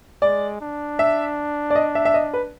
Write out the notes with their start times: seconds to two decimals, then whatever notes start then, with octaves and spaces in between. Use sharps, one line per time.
0.22 G#3 D5
0.61 D4
0.99 E5
1.70 D5
1.75 D#5
1.95 E5
2.05 E5
2.14 D#5
2.33 B4